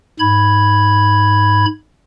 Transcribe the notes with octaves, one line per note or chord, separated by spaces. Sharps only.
G#2 B5 G#6